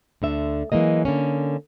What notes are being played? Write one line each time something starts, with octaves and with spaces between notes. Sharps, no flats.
D2 D3 E5
E3 F#3 G#3 A#3 D#5
D3 A#3 C#4